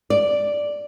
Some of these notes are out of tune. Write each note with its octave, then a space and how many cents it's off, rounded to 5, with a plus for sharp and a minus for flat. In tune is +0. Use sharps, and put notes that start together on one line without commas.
D5 +0